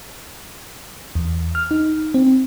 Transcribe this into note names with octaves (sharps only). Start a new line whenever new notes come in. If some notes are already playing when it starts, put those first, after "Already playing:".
E2
F6
D#4
C4